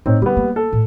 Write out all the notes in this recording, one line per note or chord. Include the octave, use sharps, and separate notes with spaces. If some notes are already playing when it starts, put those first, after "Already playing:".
A2 C4 D#4 C#5
D3 G3 B3
A#3
A4
A2